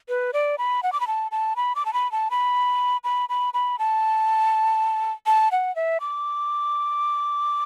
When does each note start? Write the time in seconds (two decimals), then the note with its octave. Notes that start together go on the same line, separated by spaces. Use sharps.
0.09 B4
0.33 D5
0.58 B5
0.83 F#5
0.93 D6
1.00 B5
1.07 A5
1.31 A5
1.56 B5
1.76 D6
1.86 A5
1.93 B5
2.12 A5
2.31 B5
3.04 B5
3.29 B5
3.54 B5
3.79 A5
5.26 A5
5.52 F#5
5.76 E5
6.01 D6